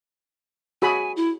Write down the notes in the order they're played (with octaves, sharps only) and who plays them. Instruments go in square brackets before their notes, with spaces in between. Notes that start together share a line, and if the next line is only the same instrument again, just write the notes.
[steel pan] F#4 G#4 B5 [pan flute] G#5
[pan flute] E4